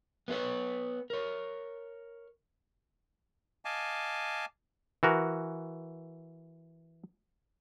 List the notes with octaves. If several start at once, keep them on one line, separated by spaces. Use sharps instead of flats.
B3 E4 F4 B4 C#5
A#4 C#5
D#5 F5 G#5 A5 D6
E3 F#4 A#4